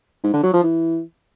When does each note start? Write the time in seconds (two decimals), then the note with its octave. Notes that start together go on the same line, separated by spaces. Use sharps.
0.24 G#2
0.34 D3
0.43 F#3
0.53 F3
0.63 E3